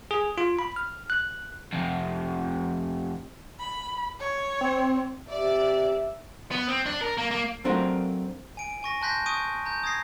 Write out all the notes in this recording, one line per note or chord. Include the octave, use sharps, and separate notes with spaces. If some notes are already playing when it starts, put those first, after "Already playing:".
G#4
F4
B5
F6
F#6
F2 C3
B5
C#5
C4
C3 D5 E5
B3
C4
D4
A#4
A#3
A#3
F#3 A3 C4 D4 F4 A#4
G#5 D7
G#5 C#6 A#6
A5 C6 F#6 G6 A#6 B6
C#6 D#6 G6 D7 D#7
A#5 G6
D#6 G#6 A#6 C7